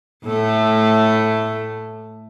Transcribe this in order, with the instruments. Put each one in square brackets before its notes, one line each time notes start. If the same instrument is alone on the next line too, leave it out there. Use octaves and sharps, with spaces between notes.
[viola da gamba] A2 A3